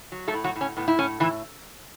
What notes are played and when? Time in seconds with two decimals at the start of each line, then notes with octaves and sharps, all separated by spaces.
0.12 F#3
0.28 A3 A4
0.34 A2
0.44 F#3 F#4
0.56 A2
0.61 C#4
0.77 A2 B3
0.88 E4
0.99 A2 C#4
1.20 A2 E3 E4